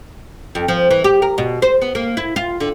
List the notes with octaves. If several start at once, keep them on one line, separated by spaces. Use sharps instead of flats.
F2
F3
E3
G4
A#4
B2
C5
B3
A#3
E4
F4
D3